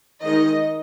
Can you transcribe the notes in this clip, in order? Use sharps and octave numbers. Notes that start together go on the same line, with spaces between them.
D#3 G#3 D#4 D#5